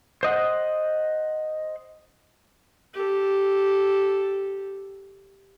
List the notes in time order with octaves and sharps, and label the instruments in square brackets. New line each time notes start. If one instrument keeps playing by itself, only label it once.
[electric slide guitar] C5 D#5 F#5
[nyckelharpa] G4 A4